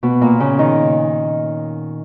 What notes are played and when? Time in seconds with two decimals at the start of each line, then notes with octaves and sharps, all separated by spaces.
0.03 B2 B3
0.21 A#2 A#3
0.40 C#3 C#4
0.59 D#3 D#4